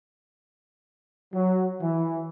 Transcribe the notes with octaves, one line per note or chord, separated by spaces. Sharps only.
F#3
E3